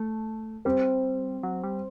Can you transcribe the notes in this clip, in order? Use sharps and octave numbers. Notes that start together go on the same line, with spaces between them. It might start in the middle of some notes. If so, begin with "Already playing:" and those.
Already playing: A3
G3 C4
F#3
G3